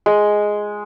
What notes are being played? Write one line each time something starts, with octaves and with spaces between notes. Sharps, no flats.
G#3